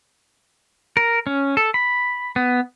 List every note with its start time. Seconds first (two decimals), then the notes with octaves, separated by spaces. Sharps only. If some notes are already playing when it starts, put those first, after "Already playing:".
0.97 A#4
1.27 C#4
1.57 A4
1.74 B5
2.36 B3